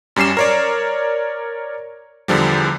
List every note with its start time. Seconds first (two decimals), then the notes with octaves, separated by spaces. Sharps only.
0.16 F#2 G3 C#4 C7 E7
0.37 A#4 C#5 D5
2.28 E2 D3 F3 G3